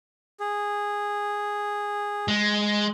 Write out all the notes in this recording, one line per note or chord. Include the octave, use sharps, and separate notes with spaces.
G#4
G#3